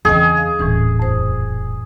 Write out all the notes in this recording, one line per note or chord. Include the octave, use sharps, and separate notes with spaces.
E2 C#3 C4 G#4 D#5 G5
F5
D#1 A2 E3 C#4
F2 C5